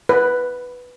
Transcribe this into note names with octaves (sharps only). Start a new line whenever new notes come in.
B4